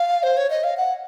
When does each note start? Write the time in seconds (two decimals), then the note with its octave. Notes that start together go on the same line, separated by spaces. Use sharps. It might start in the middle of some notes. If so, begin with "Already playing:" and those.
Already playing: F5
0.23 C5
0.37 C#5
0.50 D#5
0.64 F5
0.77 F#5